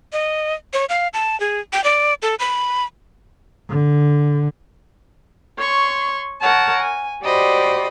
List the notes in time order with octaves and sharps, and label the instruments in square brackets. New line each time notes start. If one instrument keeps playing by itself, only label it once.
[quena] D#5
C#5
F5
A5
G#4
G5
D5
A4
B5
[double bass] D3
[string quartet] C#5 C6 C#6
A#4 C#5 F#5 A5
G#5
F#4 G4 C5 D5 D#5 B5